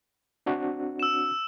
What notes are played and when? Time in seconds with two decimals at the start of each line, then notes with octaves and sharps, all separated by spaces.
0.46 C4 D4 F#4
0.99 E6 E7